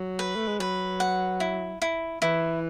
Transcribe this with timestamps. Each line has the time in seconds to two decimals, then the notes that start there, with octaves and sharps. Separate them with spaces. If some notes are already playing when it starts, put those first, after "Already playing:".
Already playing: F#3
0.19 B4
0.35 A3
0.47 G#3
0.60 F#3 B4
1.00 F#5
1.40 E4
1.82 E4
2.22 E3 E4